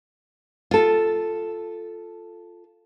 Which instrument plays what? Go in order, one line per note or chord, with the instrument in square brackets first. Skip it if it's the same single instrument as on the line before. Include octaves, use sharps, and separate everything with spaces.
[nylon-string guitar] F4 A4